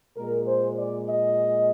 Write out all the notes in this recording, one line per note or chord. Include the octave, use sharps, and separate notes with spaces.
A#2 G#3 A#4
C5
D5
D#5